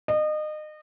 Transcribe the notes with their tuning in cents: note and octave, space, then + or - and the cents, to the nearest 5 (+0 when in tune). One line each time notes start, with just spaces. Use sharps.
D#5 -30